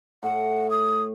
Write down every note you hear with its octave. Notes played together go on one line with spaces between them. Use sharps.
A2 F#5
D#6